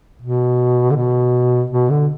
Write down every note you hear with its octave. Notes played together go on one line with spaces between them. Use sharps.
B2
D3
B2
B2
D3